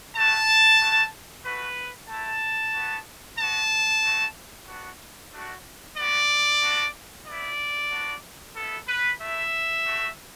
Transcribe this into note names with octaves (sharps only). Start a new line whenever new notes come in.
A3 F#4 A5
A3 F#4
A3 F#4 B4
A3 E4 A5
B3 F#4
B3 F#4 A5
A3 F#4
B3 D4 F#4
A3 D4 F#4
B3 F#4 D5
B3 D4 F#4
B3 E4 D5
B3 D4 F#4
B3 E4 A4
B4
A3 E4 E5
A3 F#4